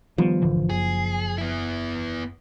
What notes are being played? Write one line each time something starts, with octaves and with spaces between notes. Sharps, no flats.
D#3 F3 G3 B3
G#1 D3 E3
F#1 G#4
B3 E4